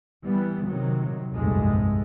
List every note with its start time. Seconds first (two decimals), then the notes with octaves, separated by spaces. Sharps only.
0.25 E3 G3 B3
0.65 C3 D#3 F#3
1.33 F1 C2 G2 A#2 G#3 A3